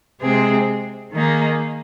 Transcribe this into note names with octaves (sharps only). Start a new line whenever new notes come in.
C3 G#3 C4 G#4
D#3 A#3 D#4 G#4